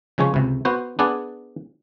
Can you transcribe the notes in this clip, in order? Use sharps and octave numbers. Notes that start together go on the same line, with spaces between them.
C#3 F3 G#3 C#4 C#5
C#2 C3
B3 F#4 C5
B3 D4 G#4 D5 F#5